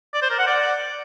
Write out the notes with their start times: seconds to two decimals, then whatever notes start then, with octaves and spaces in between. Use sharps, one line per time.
0.14 D5
0.22 C5
0.30 A#4
0.39 F#5
0.47 D5